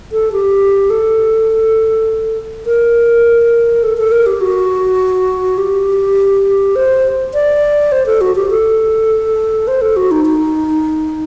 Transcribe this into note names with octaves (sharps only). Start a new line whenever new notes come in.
A4
G4
A4
A#4
A4
A4
A#4
G4
F#4
G4
C5
D5
C5
A4
F#4
G4
A4
C5
A4
F#4
D#4
D#4